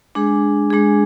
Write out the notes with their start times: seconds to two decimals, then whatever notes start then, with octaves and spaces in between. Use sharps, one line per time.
0.15 G#3 D4 G#4
0.70 G#3 D4 G#4